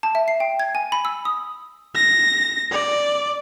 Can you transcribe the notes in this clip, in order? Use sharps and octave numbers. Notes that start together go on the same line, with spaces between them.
A5
E5
C7
G5
G#6
G#5
B5
E6
D#6
A#6
D5